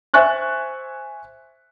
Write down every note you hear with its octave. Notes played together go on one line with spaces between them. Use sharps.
C5 E5 G#5 C#6 F#6 A6